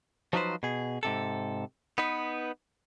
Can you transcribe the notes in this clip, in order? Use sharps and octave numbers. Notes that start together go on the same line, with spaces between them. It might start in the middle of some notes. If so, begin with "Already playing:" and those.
F3 F#3 D#4 F4 B4 C5
B2 G#4
G#2 C3 A4
B3 D#4 B4